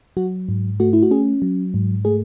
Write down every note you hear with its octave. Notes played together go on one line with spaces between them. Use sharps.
F#3 F#4
G#2
A3 F#4
E4
F#4
C#4 G#4
F#3
G#2
A3 G#4